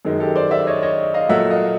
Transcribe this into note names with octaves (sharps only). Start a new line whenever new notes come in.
F#2 D#3 G#3
G4 A4
C5 D5
D5 E5
C#5 D#5
C#5 D#5
D#5 F5
A#2 F#3 A3 E5 F#5
D#5 F5